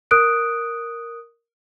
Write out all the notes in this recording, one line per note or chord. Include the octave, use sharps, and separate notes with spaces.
A#4 D#6 F#6 D7